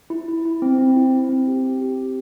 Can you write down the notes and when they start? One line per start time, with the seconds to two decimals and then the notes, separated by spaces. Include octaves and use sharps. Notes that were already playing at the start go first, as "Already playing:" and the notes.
0.10 E4
0.28 E4
0.45 E4
0.62 C4
0.79 C4
0.96 E4
1.13 E4
1.29 C4
1.47 G4
1.64 C4
1.81 G4
1.98 C4